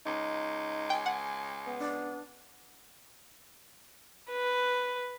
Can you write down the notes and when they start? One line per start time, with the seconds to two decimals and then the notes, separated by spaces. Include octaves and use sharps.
0.06 C#2 D#4
0.90 G5 G#5
1.06 F#5
1.67 B3
1.79 D4
4.31 B4